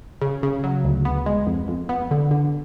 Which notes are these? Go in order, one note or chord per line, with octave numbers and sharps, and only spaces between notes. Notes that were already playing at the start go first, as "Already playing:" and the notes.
C#3
C#3
F#3
D2
B3
G#3
F2
F2
B3
D3
D3